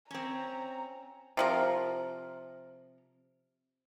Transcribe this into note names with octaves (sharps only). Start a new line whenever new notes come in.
C4 C#4 A#5
C3 F3 A#4